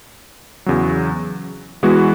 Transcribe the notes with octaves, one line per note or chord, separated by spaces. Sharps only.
E2 C#3 F#3
E3 G#3 B3 F#4